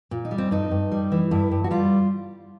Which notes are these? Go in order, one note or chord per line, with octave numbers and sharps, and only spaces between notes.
A#2
D#4
G3
C4
G2 D#4
G2
G3
E3
G2 E4
G2
F#4
G3 F4